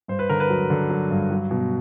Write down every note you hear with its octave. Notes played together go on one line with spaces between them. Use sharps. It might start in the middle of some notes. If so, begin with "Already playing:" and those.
G2 C5
B4
D3 A#4
B4
F#3
D3
F#3
G2
F#3
B2